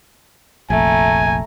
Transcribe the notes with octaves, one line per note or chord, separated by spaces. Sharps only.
F1 A#1 A3 G#5 A#5